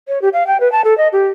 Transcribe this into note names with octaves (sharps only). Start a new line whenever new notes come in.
C#5
G4
F5
G5
B4
A5
A4
D#5
G4